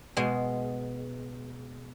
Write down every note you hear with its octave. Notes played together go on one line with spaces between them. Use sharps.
B2 G#3